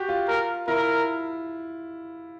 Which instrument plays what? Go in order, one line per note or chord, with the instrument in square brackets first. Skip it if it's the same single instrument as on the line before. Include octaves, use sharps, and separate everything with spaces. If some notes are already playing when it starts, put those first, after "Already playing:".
Already playing: [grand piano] F#4 G4
F4
[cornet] A#4
[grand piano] E4 [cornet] A#4